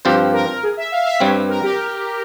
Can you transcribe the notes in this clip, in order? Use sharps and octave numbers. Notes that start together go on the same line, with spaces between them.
G2 F3 C4 F4 G4 C5
A#4
G#4
E5
F5
E5
G2 G3 C4 C#5
A#4
G4